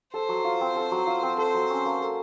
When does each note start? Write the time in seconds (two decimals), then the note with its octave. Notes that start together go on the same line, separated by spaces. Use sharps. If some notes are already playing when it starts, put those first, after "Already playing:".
0.14 A4 C5
0.29 F#3
0.44 F4
0.61 C4
0.76 A4
0.91 F#3
1.07 F4
1.23 C4
1.38 A4 C5
1.54 F#3
1.70 C#4
1.86 A#3
2.01 A4